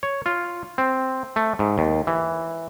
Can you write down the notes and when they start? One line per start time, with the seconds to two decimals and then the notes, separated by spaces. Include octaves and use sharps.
0.03 C#5
0.26 F4
0.78 C4
1.36 A3
1.59 G#2
1.78 D#2
2.07 E3